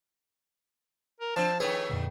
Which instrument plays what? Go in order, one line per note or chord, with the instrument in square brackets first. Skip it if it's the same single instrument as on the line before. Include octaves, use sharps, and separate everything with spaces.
[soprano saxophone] A#4
[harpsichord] F3 [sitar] C4 D4 [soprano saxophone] A5
[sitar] D#3 F3 A3 [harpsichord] G#4 [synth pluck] B4 G5 [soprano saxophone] C#5
[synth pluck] F2 A#2 D3